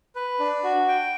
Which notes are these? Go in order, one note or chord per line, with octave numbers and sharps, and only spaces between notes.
B4
D4
F#4
G5